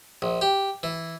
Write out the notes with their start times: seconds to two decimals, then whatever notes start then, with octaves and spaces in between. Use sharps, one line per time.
0.22 A#1
0.41 G4
0.83 E3